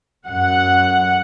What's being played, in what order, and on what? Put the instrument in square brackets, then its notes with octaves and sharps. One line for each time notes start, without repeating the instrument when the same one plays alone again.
[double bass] F#2 [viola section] F#5